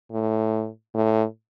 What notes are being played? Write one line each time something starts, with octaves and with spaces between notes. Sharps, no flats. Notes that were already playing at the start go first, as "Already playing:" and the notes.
A2
A2